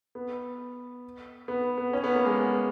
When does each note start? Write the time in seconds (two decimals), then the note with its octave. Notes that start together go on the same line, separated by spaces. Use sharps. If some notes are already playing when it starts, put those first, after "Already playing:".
0.15 B3
1.48 B3
1.78 B3
1.93 C#4
2.04 B3
2.15 A#3
2.25 G#3
2.37 B3